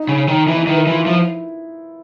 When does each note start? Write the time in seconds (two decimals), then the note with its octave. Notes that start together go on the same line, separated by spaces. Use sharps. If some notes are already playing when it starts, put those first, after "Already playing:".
Already playing: D#4
0.09 C#3
0.28 D#3
0.48 E3 E4
0.56 D#4
0.63 E4
0.67 D#3 B4
0.77 A#4
0.87 E3 F4
1.06 F3 E4